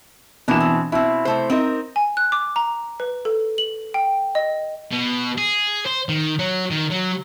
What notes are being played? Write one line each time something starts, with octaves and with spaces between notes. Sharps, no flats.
B2 E3 A#3 D4 E7
C4
B2 C4 E4
C3 A3 C5
C4 D#4 A#4
G#5
F#6
D6
A#5
B4
A4
F#7
G5
D#5
B2
G#4
C5
D#3
F#3
D#3
F#3